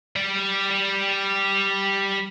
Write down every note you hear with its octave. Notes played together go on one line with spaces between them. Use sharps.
G3 D5